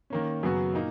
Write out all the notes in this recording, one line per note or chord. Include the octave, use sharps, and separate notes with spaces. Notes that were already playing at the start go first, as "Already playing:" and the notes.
D#3 A#3 C#4
F#2 C#3 F#3 B3 F#4
A#2 A#3 D#4